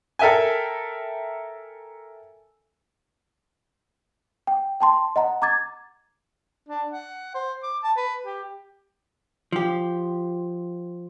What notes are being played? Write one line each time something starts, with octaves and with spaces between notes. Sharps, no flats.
A4 A#4 E5 G5 G#5
G5
G5 A5 C6
D#5 F#5 A#5
A#5 D6 G#6 A6
D4
F#5
C5
D6
A5
B4
G4
F3 G4